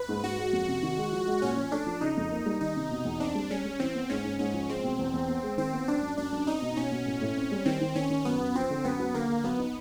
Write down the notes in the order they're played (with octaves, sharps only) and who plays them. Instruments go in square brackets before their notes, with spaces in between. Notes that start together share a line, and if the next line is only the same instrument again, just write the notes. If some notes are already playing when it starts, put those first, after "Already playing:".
Already playing: [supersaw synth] B4
[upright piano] G#2
[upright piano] G#2 [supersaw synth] F#4
[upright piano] G#3
F2
C3
D#3
G#3
F3
G#3
[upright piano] A#2 [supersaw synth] C#4
[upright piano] F3
[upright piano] A3 [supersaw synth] D4
[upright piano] F3
[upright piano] C#3 [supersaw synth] D#4
[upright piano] F2
A#3
G3
[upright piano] D#3 [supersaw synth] D#4
[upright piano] C3
B2
E2
[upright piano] C4 [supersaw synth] D4
[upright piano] G3
[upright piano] G3 [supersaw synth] C#4
[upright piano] G3
[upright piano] E3 [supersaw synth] C4
[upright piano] B3
[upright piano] G#2 [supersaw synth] C#4
[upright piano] G#2
[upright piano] G#2 [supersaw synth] C#4
[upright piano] F3
[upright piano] G#3 [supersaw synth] C4
[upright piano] B2
E2
E2
B3
G#3
[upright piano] D#3 [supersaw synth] C4
[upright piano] B3
[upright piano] F#2 [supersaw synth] D4
[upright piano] F#2
[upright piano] F#2 [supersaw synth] D4
[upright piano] F#2
[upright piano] C4 [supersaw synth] D#4
[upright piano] B2
[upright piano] B2 [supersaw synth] C#4
[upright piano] B2
A2
A2
C4
G3
[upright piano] D#3 [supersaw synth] C4
[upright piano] D#3
[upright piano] D#3 [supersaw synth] C#4
[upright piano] D#3
[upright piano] F#2 [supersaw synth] B3
[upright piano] F#2
[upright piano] F3 [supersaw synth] C4
[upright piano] D3
[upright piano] F#2 [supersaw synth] B3
[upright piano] F#3
[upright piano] D3 [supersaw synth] A#3
[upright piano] D3
[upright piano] F#3 [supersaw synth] B3
[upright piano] D#4